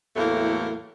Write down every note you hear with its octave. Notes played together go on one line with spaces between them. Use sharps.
E2 A2 E3 F#3 A3 A#3